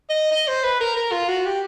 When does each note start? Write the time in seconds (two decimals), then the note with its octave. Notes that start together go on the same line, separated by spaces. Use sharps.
0.10 D#5
0.31 D#5
0.48 C5
0.63 B4
0.81 A#4
0.96 A#4
1.12 F4
1.28 F#4
1.45 G4